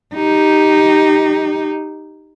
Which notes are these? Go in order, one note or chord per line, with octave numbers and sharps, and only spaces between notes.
D#4 G4